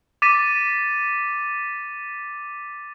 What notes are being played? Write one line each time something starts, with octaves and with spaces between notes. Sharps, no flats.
D6 A6 B6 D#7